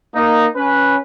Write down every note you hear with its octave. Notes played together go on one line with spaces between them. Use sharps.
A#3 D#4
C#4 B4